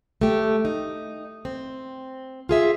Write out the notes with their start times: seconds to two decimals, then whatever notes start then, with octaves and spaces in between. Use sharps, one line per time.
0.21 A3 G4
0.65 D#4
1.45 C4
2.49 F4 G#4 E5